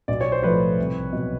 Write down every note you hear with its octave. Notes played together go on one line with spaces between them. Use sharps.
B1 D5
C#5
C5
A2 F3 A3 B4 C#5
C2
B2 F#3